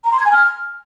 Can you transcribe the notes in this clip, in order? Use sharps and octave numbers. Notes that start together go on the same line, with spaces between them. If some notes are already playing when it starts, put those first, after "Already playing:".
A#5
C6
G#6
G#5
F6